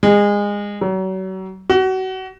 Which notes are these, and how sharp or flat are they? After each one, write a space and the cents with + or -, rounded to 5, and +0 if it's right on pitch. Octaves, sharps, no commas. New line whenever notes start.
G#3 -25
F#3 +35
F#4 +30